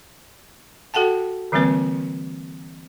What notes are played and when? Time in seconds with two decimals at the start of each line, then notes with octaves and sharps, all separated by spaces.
0.94 F#4 A4 F#5 G5 A5
1.52 D3 E3 G3 A#3 C4 B4